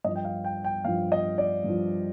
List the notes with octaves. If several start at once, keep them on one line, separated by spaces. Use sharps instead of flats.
G2 F3 D#5
G5
F5
G5
G5
G2 F3 F5
D#5
D5
G2 F3